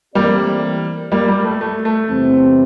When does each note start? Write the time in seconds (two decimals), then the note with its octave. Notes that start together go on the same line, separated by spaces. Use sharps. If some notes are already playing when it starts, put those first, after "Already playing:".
0.15 E3 G3 A3 A#3 C4 G4 D5
1.12 G3 A#3
1.28 G3
1.45 A3
1.61 A3
1.85 A3
2.09 E2 C3 E3 G3 C4